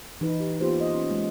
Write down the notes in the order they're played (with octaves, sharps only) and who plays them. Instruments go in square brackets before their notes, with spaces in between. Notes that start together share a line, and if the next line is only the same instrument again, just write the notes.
[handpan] E3 D#4 E4 B4
G4
A#3 B3 F4 G4 C5
D#5
C#4
G#3